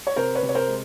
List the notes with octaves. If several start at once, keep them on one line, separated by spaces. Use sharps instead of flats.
C#5
C3 A#4 C5
B4 C#5
C3
C#5
A#4 C5
G#3